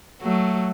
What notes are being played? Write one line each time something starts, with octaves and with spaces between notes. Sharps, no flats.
F#3 A3